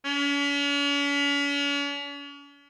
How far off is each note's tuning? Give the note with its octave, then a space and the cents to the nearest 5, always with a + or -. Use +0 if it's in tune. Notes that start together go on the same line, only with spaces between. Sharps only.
C#4 +45